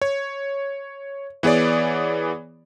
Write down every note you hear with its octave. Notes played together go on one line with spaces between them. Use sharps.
C#5
E3 B3 G#4 C#5 D5